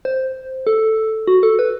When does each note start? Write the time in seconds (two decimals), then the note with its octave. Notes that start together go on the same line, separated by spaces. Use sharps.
0.05 C5
0.67 A4
1.27 F#4
1.43 A4
1.59 B4